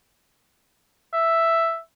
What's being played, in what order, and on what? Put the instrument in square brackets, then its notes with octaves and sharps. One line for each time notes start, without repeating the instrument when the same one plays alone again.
[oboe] E5